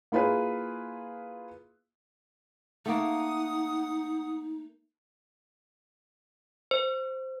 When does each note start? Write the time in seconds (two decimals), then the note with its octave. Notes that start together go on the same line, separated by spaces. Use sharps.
0.12 A#3 E4 F4 G#4 B4
2.86 A3 A#3 D#4 F#5 D#6
6.71 C5